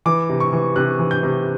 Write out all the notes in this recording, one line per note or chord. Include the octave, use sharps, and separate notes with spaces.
E3 D6
C3
C#6
E3
C3 F#6
E3
G6
C3